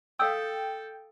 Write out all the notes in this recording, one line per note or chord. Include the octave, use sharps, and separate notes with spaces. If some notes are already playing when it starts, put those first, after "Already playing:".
A4 F5 G5 D#6 E6